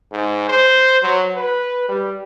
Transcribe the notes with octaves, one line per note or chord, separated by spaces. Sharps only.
G#2
C5
F#3
B4
G3